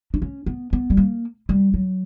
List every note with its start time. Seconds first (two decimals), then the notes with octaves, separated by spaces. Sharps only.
0.14 D4
0.22 C#4
0.46 B3
0.73 B3
0.90 G3
0.97 A#3
1.49 G3
1.74 F#3